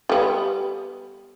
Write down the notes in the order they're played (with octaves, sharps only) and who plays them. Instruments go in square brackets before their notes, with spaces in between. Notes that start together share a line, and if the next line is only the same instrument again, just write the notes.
[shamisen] G3 B3